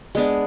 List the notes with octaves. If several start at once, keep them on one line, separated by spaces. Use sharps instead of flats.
G#3 B3 D4